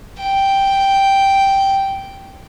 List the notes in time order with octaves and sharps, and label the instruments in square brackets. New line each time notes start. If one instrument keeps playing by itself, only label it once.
[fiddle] G5